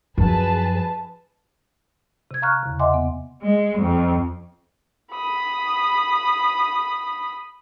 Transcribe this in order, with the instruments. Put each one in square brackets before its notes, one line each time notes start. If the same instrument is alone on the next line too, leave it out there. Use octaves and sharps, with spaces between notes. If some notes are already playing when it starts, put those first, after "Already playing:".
[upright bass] F#2 F3 [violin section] G#4 B4 A5
[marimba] C3 G#6
F5 A#5 C#6 F6 F#6
E2 C#3
D#5 E5 F#5 G#5 C6 D6
B3
[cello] G#3
F2
[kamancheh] B5 D#6